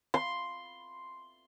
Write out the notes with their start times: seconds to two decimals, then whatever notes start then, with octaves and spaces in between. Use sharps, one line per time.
0.14 C6